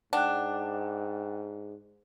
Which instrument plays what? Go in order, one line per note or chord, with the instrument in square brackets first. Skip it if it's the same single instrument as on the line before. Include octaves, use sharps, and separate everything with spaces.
[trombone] G#2 [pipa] D4 [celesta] F#5 G5 F#6